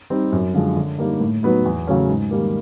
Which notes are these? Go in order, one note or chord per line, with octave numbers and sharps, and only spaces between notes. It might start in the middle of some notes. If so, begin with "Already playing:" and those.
G3 C4 D#4
F#2
D3 F3 G#3
D3
G3 A#3 D#4
A2
F#3 B3 D#4
E2
C#3 F#3 A3 C#4
G#2
D#3 G3 A#3